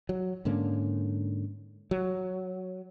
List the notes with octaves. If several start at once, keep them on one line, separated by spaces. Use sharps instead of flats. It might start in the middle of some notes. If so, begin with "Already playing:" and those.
F#3
G#2 D3 A#3 C#4
F#3